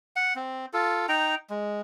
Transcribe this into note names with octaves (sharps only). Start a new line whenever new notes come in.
F#5
C4
F4 A4
D#4 G5 A#5
G#3